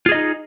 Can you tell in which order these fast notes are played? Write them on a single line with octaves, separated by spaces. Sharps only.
F4 G#4 D#5 D#4